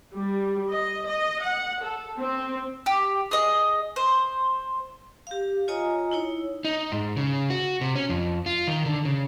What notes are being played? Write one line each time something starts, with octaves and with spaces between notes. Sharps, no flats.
G3
D#5
D#5
F#5
A4
C4
G4
G#4 D#5
C5
G4 F5
F4 C#5 D#5 G#5 A#5 D#6
D#4 E4 C#5
D#4
G#2
C#3
F#4
C3
C#4
F2
F4
D#3
D3
C#3